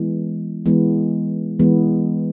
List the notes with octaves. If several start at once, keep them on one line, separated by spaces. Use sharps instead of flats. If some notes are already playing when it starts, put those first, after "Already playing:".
Already playing: E3 G#3 B3
E3 G#3 B3
E3 G#3 B3